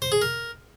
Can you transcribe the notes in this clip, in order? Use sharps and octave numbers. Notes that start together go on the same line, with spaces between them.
C5
G#4
A#4